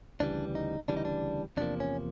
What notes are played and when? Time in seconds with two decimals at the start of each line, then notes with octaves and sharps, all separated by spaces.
0.20 D2 C#3 E3 G3 D4
0.55 D#4
0.88 D2 C#3 E3 G3 D4
0.97 D#4
1.05 D4
1.57 E2 C3 F3 A#3 D4
1.80 C#4